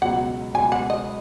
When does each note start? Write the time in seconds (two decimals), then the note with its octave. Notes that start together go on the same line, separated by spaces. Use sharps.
0.02 C#2 B2 F#3 F#5
0.54 C#2 B2 F#3 G#5
0.72 F#5
0.90 D#5